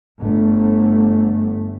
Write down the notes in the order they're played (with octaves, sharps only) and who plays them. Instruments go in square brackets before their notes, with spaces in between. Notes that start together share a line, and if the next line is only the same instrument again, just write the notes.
[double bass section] G1 A3